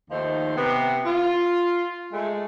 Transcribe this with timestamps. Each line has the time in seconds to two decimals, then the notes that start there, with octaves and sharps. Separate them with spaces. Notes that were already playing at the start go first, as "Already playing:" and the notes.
0.10 D#2 D#3 F3 A3 C5
0.56 C3 B3
1.05 F4
2.12 G#3 A3